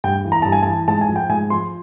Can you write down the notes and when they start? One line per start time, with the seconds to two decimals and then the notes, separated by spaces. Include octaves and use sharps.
0.04 G2 G5
0.25 E3
0.32 A#5
0.42 G2 A5
0.52 G#5
0.63 E3 A5
0.88 G#2 A5
1.01 G#5
1.09 F3
1.16 G5
1.29 G#2 G#5
1.50 F3 C6